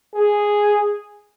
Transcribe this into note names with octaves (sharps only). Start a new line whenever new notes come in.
G#4